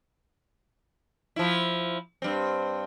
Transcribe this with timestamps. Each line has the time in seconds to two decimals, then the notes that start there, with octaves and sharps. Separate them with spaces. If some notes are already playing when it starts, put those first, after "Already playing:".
1.36 F3 E4
2.22 G2 C4